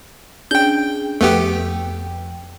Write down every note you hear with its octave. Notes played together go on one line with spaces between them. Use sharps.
C#4 D4 G#4 G5 G6
F2 A3 B3 G4 G5